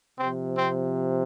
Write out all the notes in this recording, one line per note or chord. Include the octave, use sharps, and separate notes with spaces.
C3 F3 C4
C4